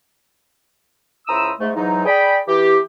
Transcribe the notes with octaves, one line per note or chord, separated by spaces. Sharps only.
C#2 E4 C5 A#5 D#6 E6
G#2 A3
G#2 E3 F#3 D#4
G#4 D5 G5 B5
E3 G4